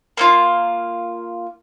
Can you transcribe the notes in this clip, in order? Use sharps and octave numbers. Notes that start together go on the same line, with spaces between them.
A#3 D#4 F4